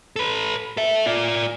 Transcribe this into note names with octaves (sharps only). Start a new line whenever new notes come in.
A4 B4
A4 E5
F4 D5